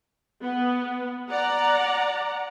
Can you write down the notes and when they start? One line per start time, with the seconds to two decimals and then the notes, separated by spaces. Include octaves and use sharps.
0.42 B3
1.31 D5 F#5 A#5